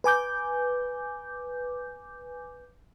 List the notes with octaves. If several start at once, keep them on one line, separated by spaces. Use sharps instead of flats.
B4 G#5 D6 G6